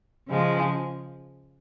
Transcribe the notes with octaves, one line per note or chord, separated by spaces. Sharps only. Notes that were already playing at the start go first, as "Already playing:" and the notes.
C#3 F3 G#3